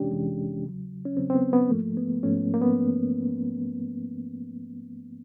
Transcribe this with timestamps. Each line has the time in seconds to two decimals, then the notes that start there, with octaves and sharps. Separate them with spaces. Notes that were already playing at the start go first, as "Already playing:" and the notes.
Already playing: F2 C3 E3 G#3 C#4 D4 G4
0.11 F2 C3 E3 G#3
0.64 E2 C#3 F#3
1.06 C#4
1.17 E2 C#3 F#3 C4
1.30 C4
1.35 B3
1.53 B3
1.70 G#2 F3 A3 A#3
1.97 B3
2.23 G#2 F3 A3 C#4
2.54 A#3
2.61 B3